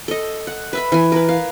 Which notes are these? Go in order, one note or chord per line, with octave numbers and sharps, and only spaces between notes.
A4 D#5
F#5
B4 E5 B5
E3 G#5
A#4 B4
F5